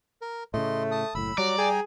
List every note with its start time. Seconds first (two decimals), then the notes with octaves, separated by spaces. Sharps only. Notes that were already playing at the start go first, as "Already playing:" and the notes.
0.22 A#4
0.54 A2 C#3 A3 D#5 C6
0.91 A5 D#6
1.15 F#1 A2 B5 E6
1.38 F#3 G3 D5 A#5
1.58 G#4 G5 G#5 A#5